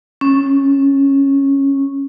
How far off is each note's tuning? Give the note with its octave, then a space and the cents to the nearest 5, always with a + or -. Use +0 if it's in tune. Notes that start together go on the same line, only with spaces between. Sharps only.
C#4 -10